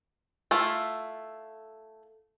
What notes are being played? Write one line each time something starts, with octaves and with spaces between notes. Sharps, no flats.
A3 E4 F4